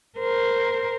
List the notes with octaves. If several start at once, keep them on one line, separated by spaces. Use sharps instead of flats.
A#4 C5